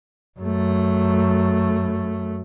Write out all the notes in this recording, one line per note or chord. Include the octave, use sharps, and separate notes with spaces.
F#2 A3